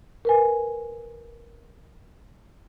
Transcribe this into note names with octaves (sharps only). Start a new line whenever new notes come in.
A#4 B4 G#5